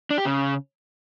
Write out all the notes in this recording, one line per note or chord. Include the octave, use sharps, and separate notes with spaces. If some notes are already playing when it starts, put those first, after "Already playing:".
D4
G4
C#3